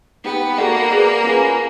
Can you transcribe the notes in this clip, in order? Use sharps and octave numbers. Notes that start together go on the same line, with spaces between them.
B3 D#4 G4 B4
A#3 F#4 A4 D5 F#5
G#4 B4 D5
C#4 F4 G#4 B4